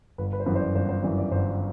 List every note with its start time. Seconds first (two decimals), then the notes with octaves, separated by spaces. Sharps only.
0.18 G1 B4
0.33 B4
0.40 C5
0.46 F#2 E3 B4
0.55 C5
0.60 D5
0.75 G1 C5
0.89 C5
1.03 F#2 E3 D5
1.18 D5
1.31 G1 C5